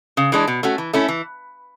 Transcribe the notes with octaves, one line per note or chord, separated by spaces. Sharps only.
C#3
E3 G#3 D4
B2
A3 C#4 F#4
E3
A3 C#4 E4
E3